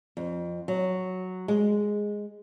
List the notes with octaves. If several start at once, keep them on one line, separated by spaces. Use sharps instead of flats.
F2
F#3
G#3